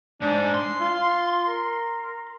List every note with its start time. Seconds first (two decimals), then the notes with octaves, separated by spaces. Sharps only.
0.21 G#2 D4
0.54 C6
0.80 F4
1.48 A#4